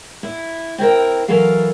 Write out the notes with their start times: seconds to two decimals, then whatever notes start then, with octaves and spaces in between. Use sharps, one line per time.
0.23 E4
0.78 C4 E4 A#4 G5
1.28 E3 F#3 A4 A#4 F5